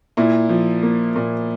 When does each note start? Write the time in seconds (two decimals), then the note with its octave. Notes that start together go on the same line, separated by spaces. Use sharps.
0.17 A#2 E4
0.49 F3
0.83 A#3
1.16 A#2